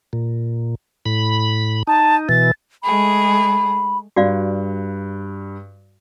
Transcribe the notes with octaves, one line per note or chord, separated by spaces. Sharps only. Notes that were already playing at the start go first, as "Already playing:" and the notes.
A#2
A2 B5
D#4 A5
B2 E3 A6
G#3 A3 G#4 B5
G2 F#4 D5 F5